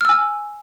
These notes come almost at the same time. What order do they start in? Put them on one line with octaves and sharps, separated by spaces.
F6 E6 G#5